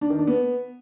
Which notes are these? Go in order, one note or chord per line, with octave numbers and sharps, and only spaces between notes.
D4
D#3
D4
B3